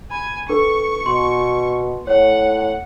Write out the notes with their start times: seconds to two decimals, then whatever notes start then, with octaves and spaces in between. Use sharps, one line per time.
0.11 G#5 B5
0.49 D4 A4 B4 C#6
1.06 B2 C6
2.07 A2 C#5 F#5